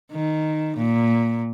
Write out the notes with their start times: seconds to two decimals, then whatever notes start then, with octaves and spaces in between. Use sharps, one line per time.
0.12 D#3
0.77 A#2